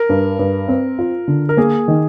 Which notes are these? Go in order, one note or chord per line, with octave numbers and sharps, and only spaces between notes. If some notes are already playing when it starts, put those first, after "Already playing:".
Already playing: A#4
G2
G2
C4
F4
D3
A#4
A#3 G#4
D#3